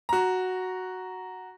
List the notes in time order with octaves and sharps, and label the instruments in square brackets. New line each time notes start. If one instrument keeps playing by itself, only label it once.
[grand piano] F#4 A#5